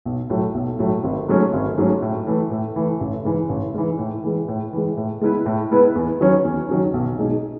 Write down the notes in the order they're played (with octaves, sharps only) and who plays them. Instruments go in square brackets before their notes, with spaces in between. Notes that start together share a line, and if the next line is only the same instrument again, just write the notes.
[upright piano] B1
A2 F#3 A3
B1
A2 F#3 A3
G#1
G#2 F#3 A3 C#4
G#1
G#2 F#3 A3 C#4
A2
E3 A3
A2
E3 A3
A1
G#2 E3
A1
G#2 E3
A2
E3 G#3
A2
E3 G#3
A2
G#3 B3 E4 B4
A2
G#3 B3 E4 B4
E2
D#3 F#3 C#4
E2
D#3 F#3 C#4
B1
B2 G#3 D#4 G#4